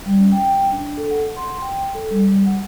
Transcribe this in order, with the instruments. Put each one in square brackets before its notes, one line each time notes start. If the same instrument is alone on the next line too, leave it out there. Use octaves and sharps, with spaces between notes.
[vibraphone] G3
C#4
G5
G5
D4
A4
F#5
C6
G5
A4
G3
F#5